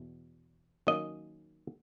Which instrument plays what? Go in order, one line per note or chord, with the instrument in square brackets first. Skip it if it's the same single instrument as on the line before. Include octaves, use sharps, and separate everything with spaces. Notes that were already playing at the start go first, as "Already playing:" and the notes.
Already playing: [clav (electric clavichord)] E2 B2
D#3 F#3 A#3 C#4 D#5